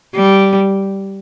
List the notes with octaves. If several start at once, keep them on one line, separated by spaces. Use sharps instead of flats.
G3